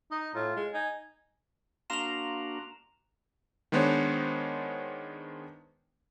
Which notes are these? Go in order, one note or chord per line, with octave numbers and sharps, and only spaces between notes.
D#4 D#5
A2 F4
G#3
D#4 G#5
A#3 D4 F#4 F5 A#5 C6 E7 F7
D#3 G#3 B3 D4 C5 C#5